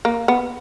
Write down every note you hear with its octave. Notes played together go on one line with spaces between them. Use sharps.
A#3
B3